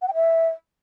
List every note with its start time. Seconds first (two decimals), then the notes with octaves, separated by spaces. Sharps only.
0.02 F#5
0.08 G5
0.14 E5